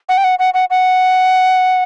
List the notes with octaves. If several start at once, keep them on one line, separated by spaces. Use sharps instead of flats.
F#5
G5
F#5
F#5
F#5
F#5